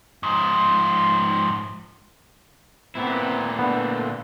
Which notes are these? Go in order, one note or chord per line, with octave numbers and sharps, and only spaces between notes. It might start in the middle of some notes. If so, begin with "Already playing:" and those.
G#2 F3
A#2 B3 C4 E4
D3 A3 B3 D4